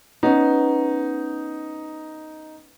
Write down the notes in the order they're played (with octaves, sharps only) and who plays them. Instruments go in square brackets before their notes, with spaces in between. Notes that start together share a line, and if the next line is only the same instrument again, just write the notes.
[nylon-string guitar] B3 C#4 [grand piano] D#4